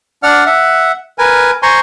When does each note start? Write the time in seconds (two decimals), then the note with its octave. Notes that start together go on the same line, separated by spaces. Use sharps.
0.23 D4 D5 F#5 F6
0.46 E5 F#5
1.18 A#4 B4 G#5
1.63 C5 G#5 A#5 C6 C#6